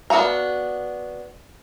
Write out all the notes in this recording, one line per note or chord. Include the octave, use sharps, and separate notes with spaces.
B3 D4 F#4 F5 A#5